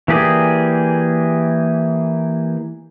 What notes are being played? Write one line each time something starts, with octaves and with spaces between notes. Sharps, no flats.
E3 A#3 G4 G#4 D5